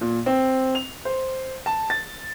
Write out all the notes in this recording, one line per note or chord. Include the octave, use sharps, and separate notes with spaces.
A#2
C4
F7
C5
A5
A6